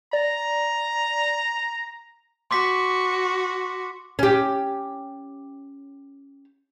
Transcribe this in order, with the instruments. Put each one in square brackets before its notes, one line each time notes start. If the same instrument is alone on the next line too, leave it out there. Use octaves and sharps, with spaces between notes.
[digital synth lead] D5 [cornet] A#5
[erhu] F#4 [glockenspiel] C6 D6 B6
[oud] C#4 G4